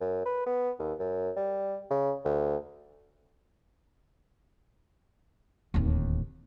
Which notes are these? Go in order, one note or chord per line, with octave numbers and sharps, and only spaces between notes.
F#2
B4
B3
D#2
F#2
G3
C#3
D2
D1 D#2